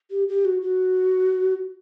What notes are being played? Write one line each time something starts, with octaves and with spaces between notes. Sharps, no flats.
G4
G4
F#4
F#4